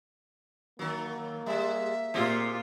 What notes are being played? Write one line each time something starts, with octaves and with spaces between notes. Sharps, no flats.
D#3 F#3 A#3
G3 G#3 E5
A#2 C4 F4 G4 G#4